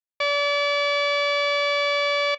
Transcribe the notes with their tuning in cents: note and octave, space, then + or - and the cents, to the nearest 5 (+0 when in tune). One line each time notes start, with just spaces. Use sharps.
D5 -35